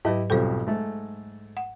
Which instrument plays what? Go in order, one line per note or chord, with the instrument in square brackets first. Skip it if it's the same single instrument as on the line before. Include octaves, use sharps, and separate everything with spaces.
[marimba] G#2 F#3 B4 [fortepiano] E4 G4 D#5
[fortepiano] B1 F2 G3 [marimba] A4 C5
[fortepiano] G#2 A3
[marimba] F#5